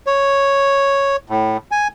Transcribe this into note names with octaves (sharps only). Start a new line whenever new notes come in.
C#5
A2
G#5